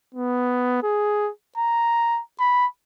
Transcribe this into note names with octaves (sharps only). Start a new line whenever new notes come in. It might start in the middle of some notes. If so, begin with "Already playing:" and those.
B3
G#4
A#5
B5